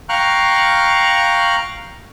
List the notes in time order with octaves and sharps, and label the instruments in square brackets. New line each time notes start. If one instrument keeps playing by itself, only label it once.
[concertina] F5 G5 A#5 C#6 F6 F#6